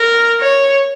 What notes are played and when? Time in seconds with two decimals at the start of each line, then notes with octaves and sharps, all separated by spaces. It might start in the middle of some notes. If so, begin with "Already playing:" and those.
Already playing: A#4
0.40 C#5